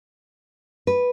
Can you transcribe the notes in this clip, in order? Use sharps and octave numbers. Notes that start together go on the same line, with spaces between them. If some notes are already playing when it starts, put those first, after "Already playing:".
B4